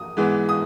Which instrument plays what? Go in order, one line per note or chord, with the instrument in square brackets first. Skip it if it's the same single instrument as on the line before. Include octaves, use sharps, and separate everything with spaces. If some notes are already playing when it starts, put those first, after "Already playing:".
Already playing: [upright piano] D#6
G#2 E3 G#3 B3
D#6